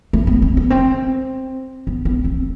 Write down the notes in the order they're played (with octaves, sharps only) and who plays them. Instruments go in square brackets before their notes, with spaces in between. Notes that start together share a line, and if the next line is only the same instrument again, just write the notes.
[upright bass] A3
B3
C4
B3
C4
B3
B3
C4